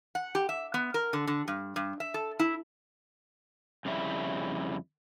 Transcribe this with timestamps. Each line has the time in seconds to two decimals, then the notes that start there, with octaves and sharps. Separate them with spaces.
0.15 F#5
0.35 G4
0.49 E5
0.74 B3
0.94 A#4
1.13 D3
1.27 D3
1.48 G2
1.76 G2
2.00 E5
2.14 A4
2.39 E4
3.85 F2 C#3 G3 E4 E5